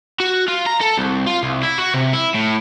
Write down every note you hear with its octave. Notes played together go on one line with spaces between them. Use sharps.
F#4
F4
A#5
A4
C2
F4
C2
E4
F#4
C3
E4
A2